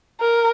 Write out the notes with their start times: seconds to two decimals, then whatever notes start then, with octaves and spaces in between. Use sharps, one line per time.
0.21 A#4